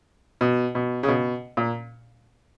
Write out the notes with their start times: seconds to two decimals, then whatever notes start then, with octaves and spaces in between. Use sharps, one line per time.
0.41 B2
0.75 B2
1.03 C#3
1.08 B2
1.57 A#2